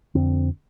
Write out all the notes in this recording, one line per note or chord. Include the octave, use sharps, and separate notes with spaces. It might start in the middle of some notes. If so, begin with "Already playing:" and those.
F2 D3 C4